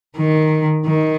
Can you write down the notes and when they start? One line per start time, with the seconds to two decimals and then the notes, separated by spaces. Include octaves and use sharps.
0.17 D#3
0.86 D#3